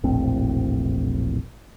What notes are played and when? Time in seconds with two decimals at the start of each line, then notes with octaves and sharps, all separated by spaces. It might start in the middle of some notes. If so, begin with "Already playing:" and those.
0.04 E1 A#1 A2 C4